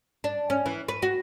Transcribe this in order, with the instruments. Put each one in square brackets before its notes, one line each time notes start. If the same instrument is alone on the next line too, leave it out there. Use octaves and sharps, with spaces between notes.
[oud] D4
C#4
E3
B4
F#4